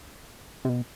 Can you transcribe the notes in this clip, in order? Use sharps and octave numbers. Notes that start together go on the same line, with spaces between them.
C3
B2